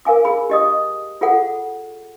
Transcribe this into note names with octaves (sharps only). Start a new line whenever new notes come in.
A#4 F5 G#5 D6
G#4 B5
G4 D#5 D#6
F4 G#4 A4 F#5